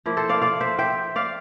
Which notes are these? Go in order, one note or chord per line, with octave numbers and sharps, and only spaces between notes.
F3 A#3 E4
A4 C5
D5 F5
D5 F5
C5 E5
E5 G5
D5 F5